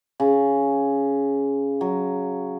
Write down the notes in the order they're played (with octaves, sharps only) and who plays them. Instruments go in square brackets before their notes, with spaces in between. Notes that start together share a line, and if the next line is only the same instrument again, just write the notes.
[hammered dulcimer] C#3
F#3